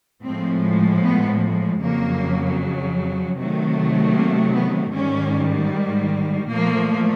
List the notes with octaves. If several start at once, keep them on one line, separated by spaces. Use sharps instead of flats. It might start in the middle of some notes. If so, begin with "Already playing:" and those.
A2 F3 G#3 C4
B3
F2 C#3 F#3 A#3
C3 D#3 F#3 A3
A#3
B3
G#2 D#3 G3 C#4
A#2 F3 A3 A#3